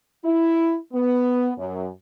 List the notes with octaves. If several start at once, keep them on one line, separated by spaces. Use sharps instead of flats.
E4
B3
F#2